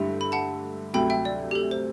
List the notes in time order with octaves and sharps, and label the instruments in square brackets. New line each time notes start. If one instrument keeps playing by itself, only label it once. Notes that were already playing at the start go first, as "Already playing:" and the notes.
Already playing: [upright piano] G2 D3 A3 E4 G4
[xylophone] B5
F#5 A5
[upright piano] D2 C3 F#3 A3 [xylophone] G5 B5
[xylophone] E5 G5
D5
G4
A4
C5